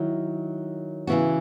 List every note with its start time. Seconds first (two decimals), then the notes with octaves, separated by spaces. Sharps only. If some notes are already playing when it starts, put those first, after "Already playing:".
Already playing: D#3 F#3 E4
1.07 C#3 E3 B3 F#4